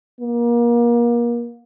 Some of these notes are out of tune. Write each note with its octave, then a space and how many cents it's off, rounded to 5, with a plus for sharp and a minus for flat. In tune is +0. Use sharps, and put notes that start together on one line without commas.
A#3 +30